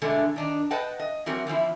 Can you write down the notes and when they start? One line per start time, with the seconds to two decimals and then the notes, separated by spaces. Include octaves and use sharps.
0.02 B2 D3 E3 G#3 A3
0.36 D#3 D4 D#4
0.71 B4 D#5 F#5 G5 A5
1.00 D#5
1.26 E3 F#3 C4 F#4 A#4
1.47 E2 E3 F3 E4